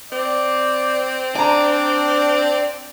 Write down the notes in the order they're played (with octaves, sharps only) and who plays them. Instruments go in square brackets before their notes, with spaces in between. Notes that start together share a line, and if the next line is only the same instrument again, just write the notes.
[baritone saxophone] C4 [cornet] D5
[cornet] D4 [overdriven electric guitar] D5 [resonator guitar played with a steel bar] G#5 A#5